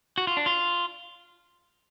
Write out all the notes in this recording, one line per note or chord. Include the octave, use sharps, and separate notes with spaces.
F#4
F4
D4
F4